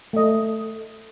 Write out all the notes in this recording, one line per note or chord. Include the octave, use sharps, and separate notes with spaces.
A3 D#5